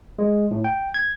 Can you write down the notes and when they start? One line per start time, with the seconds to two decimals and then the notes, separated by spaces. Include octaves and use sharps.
0.19 G#3
0.51 A2
0.64 G5
0.94 G#6